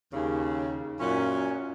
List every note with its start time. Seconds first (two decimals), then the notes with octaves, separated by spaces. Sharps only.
0.13 D#2 C#3
1.00 F#2 A#2 C#4